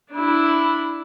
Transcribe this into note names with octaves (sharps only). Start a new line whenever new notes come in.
D4 E4